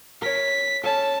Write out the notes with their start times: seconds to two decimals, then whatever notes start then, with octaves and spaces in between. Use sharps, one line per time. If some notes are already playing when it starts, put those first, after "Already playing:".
0.22 A#4 C#5 B6
0.84 C#4 A4 A5